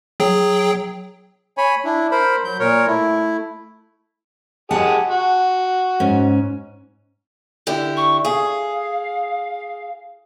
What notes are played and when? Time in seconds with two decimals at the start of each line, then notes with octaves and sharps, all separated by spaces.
0.20 F#3 G#4 G5
1.57 C#5 G#5 B5
1.85 D4 E4
2.11 A#4 C5 B5
2.45 F#3 G6
2.59 A#2 A#4 C#5
2.87 A3 E4
4.71 G4 G#4 D#5 F#5 A5
5.08 F#4
6.00 G#2 C#4
7.67 D3 E4 G4
7.97 C#6
8.25 G#4 F5